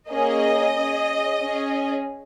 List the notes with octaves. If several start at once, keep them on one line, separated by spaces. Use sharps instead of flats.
A#3 C#4 G#4 D#5
C#4 G#4
C#4 G#4